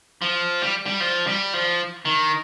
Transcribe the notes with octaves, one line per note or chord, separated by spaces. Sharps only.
F3
G3
G3
F3
G3
F3
D#3